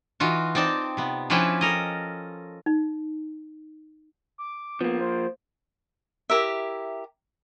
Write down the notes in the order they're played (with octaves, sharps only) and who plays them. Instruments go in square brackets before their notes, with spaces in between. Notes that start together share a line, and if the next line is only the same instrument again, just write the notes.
[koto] E3 D#4 F4 F#4
C4 D#4 D5 G5 A5
C3 B3
F3 C#4 D4 E4 B4 G5
A4 A#4 D#5
[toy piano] D#4
[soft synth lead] D6
[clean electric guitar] F3 A#3 [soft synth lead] B3
[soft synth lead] C5
[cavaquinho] E4 G4 A#4 E5